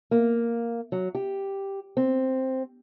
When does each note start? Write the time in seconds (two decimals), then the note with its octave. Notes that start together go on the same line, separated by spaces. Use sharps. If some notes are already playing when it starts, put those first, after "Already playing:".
0.11 A#3
0.92 F#3
1.15 G4
1.97 C4